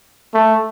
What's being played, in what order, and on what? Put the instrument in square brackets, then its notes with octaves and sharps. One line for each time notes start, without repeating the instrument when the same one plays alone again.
[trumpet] A3